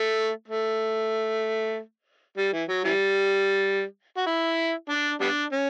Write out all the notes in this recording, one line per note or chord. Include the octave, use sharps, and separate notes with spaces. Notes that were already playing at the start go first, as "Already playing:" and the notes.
Already playing: A3
A3
G3
E3
F#3
E3 G3
F#4
E4
D4
G3 B3 D4
C#4